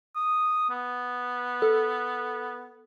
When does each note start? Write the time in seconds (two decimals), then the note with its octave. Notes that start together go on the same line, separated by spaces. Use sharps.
0.16 D#6
0.70 B3
1.62 A4